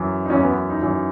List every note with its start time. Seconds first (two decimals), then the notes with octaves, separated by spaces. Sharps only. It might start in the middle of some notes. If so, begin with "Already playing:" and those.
Already playing: F#2 E3
0.26 D#4
0.30 F#2 E3 C#4
0.43 B3
0.70 D#4
0.82 F#2 E3